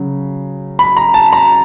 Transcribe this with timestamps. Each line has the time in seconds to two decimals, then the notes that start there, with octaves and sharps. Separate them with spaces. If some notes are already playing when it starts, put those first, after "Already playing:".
Already playing: C#3 F#3
0.79 B5
0.97 A#5
1.14 A5
1.33 A#5